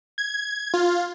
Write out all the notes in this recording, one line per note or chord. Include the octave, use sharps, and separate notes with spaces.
G#6
F4